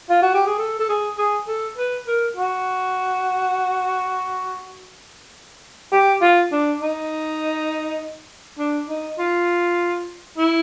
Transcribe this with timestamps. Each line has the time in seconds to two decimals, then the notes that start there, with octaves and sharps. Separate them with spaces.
0.10 F4
0.22 F#4
0.34 G4
0.47 G#4
0.58 A4
0.79 A4
0.89 G#4
1.18 G#4
1.48 A4
1.78 B4
2.07 A#4
2.37 F#4
5.92 G4
6.22 F4
6.52 D4
6.81 D#4
8.59 D4
8.89 D#4
9.19 F4
10.38 E4